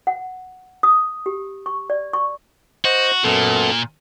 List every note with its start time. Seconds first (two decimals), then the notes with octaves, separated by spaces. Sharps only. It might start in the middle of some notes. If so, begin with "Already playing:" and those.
0.07 F#5
0.83 D#6
1.26 G4
1.66 C#6
1.90 D5
2.13 C#6
2.85 F#4 C5 D#5
3.24 F#2 A#2 B3 A4